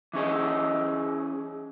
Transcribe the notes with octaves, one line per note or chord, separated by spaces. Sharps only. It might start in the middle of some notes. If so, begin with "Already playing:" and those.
E3 C#4 G#4 D#5